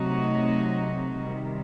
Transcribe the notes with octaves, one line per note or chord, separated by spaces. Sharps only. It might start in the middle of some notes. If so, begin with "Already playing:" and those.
Already playing: C3 F#3 A3 D#4 F#4
C3 D#3 G3